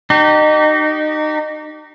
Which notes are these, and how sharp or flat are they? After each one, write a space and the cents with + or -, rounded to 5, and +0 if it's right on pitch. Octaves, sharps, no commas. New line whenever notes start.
D#4 -25 G4 -30